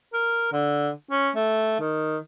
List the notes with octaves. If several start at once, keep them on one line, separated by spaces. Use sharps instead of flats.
A#4
D3
C#4
A3
D#3